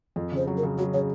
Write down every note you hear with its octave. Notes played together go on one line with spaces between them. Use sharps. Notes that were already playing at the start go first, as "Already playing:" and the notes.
F2
C#3 C5
F#3
A#4
C#3
F#3 F#4
C#3 C#5